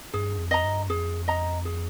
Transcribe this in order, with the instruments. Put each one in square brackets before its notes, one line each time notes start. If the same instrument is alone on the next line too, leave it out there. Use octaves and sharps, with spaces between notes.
[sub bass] G2 [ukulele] G#4
[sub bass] F2
[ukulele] D#5 A#5
[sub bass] G2
[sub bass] F2 [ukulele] G#4
[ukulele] D#5 A#5
G#4